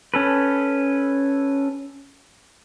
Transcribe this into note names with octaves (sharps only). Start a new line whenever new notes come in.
C#4 A4 B4